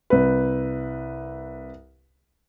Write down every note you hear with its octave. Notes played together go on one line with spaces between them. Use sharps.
C2 B4